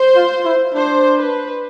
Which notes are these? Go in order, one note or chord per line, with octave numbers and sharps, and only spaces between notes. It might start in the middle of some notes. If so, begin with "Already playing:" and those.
Already playing: C5
F4
E4
D4 C5
B4